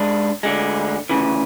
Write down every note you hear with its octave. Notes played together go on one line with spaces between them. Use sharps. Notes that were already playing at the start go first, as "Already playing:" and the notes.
Already playing: G#2 G#3 D4
D2 D3 G#3
D2 C#3 E3